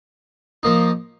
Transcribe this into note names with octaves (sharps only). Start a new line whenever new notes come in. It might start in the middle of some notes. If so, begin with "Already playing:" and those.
F3 A#3 D#4